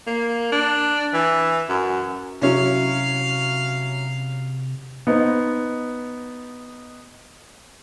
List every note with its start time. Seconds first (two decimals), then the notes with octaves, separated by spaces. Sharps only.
0.07 A#3
0.52 D4
1.14 E3
1.69 F#2
2.42 C3 F#3 C#4 E4 F5
5.07 B3 D#4 C5